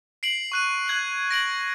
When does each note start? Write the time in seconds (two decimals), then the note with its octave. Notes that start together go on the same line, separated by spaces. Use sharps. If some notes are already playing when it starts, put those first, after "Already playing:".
0.23 C7 D7 F#7
0.52 C#6 F#6 D#7
0.88 F#6 G#6 F#7
1.31 A#6 D7 F#7